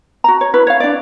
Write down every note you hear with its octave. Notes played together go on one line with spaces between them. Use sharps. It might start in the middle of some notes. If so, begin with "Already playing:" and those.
F#4 A#5
C#5
E4 B4
C#5 F5
D4 D5